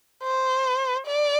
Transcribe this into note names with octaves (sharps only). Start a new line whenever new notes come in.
C5
D5